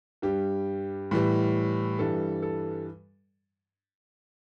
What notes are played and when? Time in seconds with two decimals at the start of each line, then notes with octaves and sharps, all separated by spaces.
0.22 G2 G3 G4
1.11 A2 E3 G3
1.98 G2 E3 G3 A4
2.42 A4